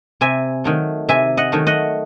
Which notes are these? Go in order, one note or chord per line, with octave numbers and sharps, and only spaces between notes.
C3 E5 G#5
D#3 F#3 A3
C3 E5 G#5
D#5 F#5
D#3 F#3 A3
D#5 F#5